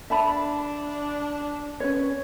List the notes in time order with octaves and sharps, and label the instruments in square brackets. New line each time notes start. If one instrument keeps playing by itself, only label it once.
[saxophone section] D4 [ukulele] E5 A5 B5
[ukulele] C#4 B4 C#5